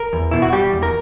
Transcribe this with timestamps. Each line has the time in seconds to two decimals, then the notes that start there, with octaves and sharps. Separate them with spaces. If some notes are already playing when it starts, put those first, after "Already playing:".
Already playing: A#4
0.13 E2
0.31 B2 E4
0.42 F#4
0.53 G3 G4
0.73 E2
0.83 A#4